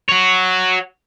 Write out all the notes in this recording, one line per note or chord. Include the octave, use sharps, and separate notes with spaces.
F#4 C#5